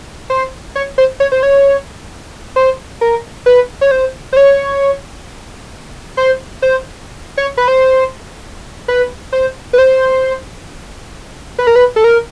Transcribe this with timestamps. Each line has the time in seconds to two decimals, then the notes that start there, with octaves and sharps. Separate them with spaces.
0.30 C5
0.75 C#5
0.98 C5
1.20 C#5
1.32 C5
1.43 C#5
2.56 C5
3.01 A#4
3.46 B4
3.81 C#5
3.91 C5
4.33 C5
4.37 C#5
6.17 C5
6.62 C5
7.38 C#5
7.57 B4
7.68 C5
8.88 B4
9.32 C5
9.73 B4
9.78 C5
11.59 B4
11.67 A#4
11.76 B4
11.96 A4
12.04 A#4